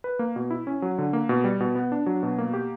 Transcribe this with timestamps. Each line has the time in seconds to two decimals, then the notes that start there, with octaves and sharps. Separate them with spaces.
0.04 B4
0.19 A#3
0.36 B2
0.51 E4
0.67 C#4
0.82 F#3
0.98 D3
1.13 A#3
1.29 B2
1.44 G3
1.60 B2
1.76 B3
1.92 D4
2.06 F#3
2.23 B2
2.38 A#3
2.53 G4